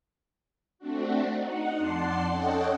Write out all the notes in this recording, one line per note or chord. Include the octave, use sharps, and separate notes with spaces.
A3 C4 D4 F#4
D#4 F#5
F2 D5 F#5 A5 C6 C7
C#4 A4 C#5 D#5 F#5 G5